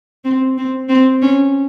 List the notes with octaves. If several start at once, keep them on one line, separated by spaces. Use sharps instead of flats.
C4
C4
C4
C#4